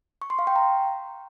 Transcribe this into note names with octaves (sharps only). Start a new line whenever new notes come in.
C#6
C6
F5
G5
A#5